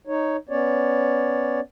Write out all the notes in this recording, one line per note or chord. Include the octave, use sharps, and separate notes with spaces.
D#4 C#5
B3 C#4 C#5 D5